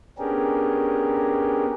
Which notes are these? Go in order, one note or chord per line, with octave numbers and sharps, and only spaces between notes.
B3 C#4 D4 G4 G#4 A#4